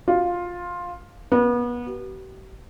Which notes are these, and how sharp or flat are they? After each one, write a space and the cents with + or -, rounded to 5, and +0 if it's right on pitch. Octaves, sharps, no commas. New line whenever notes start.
F4 +10
B3 -30
G4 -45